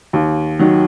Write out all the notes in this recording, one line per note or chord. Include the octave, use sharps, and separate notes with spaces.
D#2
D#3 F#3